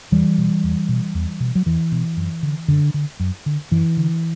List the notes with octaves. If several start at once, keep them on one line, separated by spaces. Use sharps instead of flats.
E2 E3 G3
B2
E2
B2
E2
B2
F#3
E2 E3
B2
F#2
D3
F#2 D3
D3
F#2
D3
F#2 E3
D3